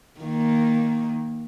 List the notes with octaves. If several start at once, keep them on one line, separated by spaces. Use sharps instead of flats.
D#3 A#3